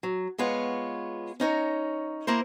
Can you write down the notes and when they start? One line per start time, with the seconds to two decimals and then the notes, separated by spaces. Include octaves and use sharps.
0.03 F#3
0.38 G#3 B3 F4 C#5
1.40 C#4 D#4 C#5 A#5
2.27 A#3 E4 A#4 C5